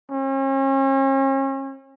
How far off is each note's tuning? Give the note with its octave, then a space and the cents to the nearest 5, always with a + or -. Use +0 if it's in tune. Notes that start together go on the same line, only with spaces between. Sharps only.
C#4 -40